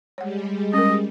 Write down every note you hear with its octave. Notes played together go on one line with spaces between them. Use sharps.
G3 G#3 C#5 F#5
C#4 A#4 D#5